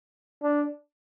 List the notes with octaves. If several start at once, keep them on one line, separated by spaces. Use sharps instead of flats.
D4